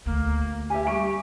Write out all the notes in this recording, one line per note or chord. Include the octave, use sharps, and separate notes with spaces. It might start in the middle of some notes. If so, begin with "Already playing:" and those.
D2 A#3
G4 E5 G#5
G3 G4 C#6 D7